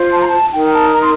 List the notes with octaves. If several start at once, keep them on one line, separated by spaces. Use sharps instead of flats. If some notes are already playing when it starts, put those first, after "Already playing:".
Already playing: F4 C5
A5
A#5
A5
D#4 A#4 G5
G5
A5
A#5
C6